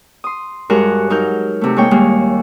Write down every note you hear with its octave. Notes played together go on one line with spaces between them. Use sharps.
C6 D#6
G2 G#3 F#4 A#4 C#5 F#6
F#3 D#4 A#4 F6 G6
C3 A3
G#3 A#3 C#5 G5
D#2 G3 G#3 A#3